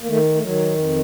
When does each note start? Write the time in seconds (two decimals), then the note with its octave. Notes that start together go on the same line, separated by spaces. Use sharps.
0.01 A#3
0.08 D#3 A3
0.35 A3
0.43 D#3 F#3
0.78 F2